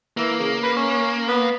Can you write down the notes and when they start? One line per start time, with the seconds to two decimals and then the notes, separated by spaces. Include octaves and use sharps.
0.17 E3 A#3
0.39 C#3
0.63 B4
0.76 C#4
1.28 B3